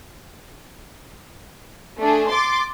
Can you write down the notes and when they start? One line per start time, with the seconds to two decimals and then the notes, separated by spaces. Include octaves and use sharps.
1.99 A3 D4 G#4
2.30 C6 D6 A6